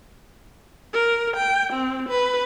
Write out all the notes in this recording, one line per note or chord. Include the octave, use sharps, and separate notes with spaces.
A#4
G5
C4
B4